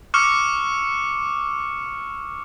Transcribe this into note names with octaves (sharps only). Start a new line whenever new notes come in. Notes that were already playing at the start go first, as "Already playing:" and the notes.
C#6 D6 E6 F6 C#7